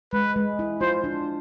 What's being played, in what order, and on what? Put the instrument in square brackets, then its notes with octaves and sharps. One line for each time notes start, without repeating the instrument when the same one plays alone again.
[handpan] G#3 [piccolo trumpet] B4
[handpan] G#3
E4
[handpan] F4 [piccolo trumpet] C5
[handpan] D4